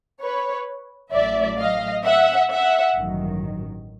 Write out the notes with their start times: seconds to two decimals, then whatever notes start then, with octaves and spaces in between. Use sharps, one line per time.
0.22 B4 C#5
1.13 A1 A2 F#3 D5 E5
1.59 D#5 F5
2.05 E5 F#5
2.51 E5 F#5
2.96 A1 G2 D#3 F#3